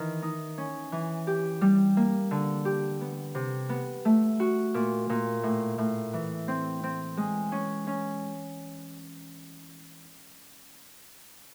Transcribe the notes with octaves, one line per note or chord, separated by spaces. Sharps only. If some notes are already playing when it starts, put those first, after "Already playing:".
Already playing: D#3 E3
D#4
C#4
E3
G4
G3
A#3
D3
G4
B3
C3
B3
A3
F#4
A#2
A#2
A2
A2
E3
C4
C4
G#3
C#4
C#4